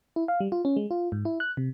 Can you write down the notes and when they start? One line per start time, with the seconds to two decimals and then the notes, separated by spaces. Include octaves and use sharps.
0.16 E4
0.28 F5
0.40 G3
0.52 F4
0.65 C#4
0.77 G#3
0.91 F4
1.12 G#2
1.25 E4
1.40 F#6
1.57 C3